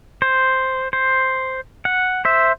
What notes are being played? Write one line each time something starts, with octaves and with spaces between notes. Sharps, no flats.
C5
C5
F#5
C5 E5